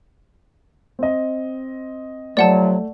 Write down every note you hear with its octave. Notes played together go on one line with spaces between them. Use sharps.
C4 D#5
C3 F3 F#3 A3 D5 F#5 A5